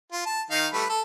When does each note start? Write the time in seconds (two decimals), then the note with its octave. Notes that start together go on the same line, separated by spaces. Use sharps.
0.12 F4
0.26 A5
0.51 D#3 D#4 F5
0.73 G3 A3 B4
0.89 A4